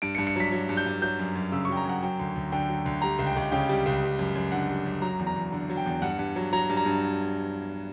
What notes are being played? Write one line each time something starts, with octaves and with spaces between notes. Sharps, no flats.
G2 D7
C#7
G2
C#7
F#3 B6
F#3
G2
G6
G2
F#3 G6
F#2
F#2
C#3 E6
C#6
F#3 G5
A#5
F#2 F#5
F#3 G5
D2
D2
D3 G5
F#3
D2
G3 A#5
C#2
G5
C#2
C#3 G5
G3
C#2
G3
F#2
F#2
D3 F#5
G3
F#2
F#3 A#5
E2
A#5
E2
D3
F#3
G5
E2
G2 F#5
G2
F#3
F#3 A#5
G2
A#5
G2